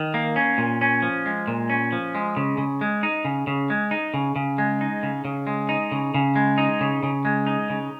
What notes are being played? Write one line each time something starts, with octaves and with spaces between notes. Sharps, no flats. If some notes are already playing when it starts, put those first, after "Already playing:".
Already playing: D#3
A#3
C#4
A#2
C#4
F3
G#3
A#2
C#4
F3
G#3
C#3
C#3
G#3
D#4
C#3
C#3
G#3
D#4
C#3
C#3
G#3
D#4
C#3
C#3
G#3
D#4
C#3
C#3
G#3
D#4
C#3
C#3
G#3
D#4
C#3